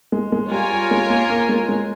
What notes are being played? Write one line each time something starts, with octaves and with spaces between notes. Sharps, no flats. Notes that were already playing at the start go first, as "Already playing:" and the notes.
G#3
G#3
G3 F4 A#4 C#5 G#5
G3
G#3
A#3
A#3
G#3
G#3